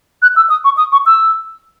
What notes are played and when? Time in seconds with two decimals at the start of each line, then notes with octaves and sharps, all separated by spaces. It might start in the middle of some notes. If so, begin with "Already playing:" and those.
0.22 F#6
0.36 E6
0.50 D#6
0.64 C#6
0.77 D#6
0.92 C#6
1.06 E6